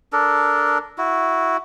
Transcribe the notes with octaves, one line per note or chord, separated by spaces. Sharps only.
D4 A4 A#4
E4 F#4